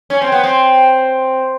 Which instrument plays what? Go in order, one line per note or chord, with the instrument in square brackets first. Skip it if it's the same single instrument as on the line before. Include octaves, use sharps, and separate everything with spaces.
[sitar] C#4
C4
B3
C4